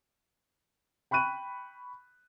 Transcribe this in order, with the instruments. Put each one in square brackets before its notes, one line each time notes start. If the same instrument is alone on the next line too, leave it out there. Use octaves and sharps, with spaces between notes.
[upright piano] G5 B5 C#6 F#6 D#7